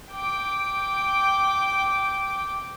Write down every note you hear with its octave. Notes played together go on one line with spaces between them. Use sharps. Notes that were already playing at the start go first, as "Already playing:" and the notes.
G5 D6